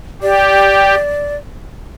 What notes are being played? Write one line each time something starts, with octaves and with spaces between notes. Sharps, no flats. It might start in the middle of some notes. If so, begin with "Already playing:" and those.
G4 D5